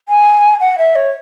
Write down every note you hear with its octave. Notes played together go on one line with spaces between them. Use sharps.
G#5
F#5
E5
C#5